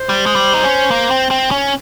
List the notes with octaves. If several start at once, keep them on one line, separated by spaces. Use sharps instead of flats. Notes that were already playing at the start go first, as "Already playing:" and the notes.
Already playing: C5
G3
G#3
G3
D#4
C#4
A#3
C4
C4
C#4